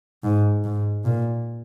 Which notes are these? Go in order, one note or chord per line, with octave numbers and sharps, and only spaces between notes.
G#2
G#2
A#2